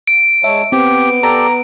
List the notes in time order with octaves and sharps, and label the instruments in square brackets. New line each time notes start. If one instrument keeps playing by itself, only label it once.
[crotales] D7
[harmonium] G#3 C#5 A5 [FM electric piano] E5
[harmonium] B3 [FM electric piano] C4 [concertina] G4
[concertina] G4 A4 D5 [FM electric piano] A#5